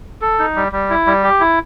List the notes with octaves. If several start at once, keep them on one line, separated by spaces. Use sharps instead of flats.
A4
D#4
G3
G3
E4
G3
G4
E4